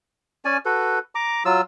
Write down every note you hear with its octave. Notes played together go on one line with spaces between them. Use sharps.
C#4 D5 G#5
F#4 A4 B4
A#5 D6
F#3 F4 E6